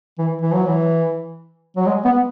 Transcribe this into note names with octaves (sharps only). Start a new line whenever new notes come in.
E3
E3
F#3
E3
F#3
G#3
B3